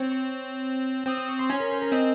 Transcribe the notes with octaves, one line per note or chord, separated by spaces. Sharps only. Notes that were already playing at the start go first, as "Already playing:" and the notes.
Already playing: C4 C#5
C#6
C4 D#6
D#6
C#6
C6
C#4 G#5
A#4
C5
A#4
C4 D#5